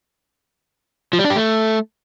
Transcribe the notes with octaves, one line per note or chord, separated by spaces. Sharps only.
F3
G3
D4
G4
A3